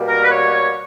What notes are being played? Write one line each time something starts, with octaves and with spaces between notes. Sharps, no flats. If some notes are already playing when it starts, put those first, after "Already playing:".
Already playing: B2 G3 A#3
A#4
B4
C#5